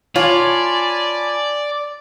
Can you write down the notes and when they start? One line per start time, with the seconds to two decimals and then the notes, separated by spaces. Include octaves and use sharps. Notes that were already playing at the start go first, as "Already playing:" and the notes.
0.16 F4 C#5 D5 G#5 A5 B5